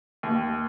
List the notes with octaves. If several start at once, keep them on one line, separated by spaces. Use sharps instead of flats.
D#2